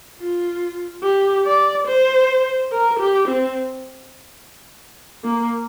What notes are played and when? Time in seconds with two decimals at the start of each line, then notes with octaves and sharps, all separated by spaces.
0.19 F4
1.03 G4
1.46 D5
1.87 C5
2.72 A#4
3.00 G4
3.28 C4
5.24 A#3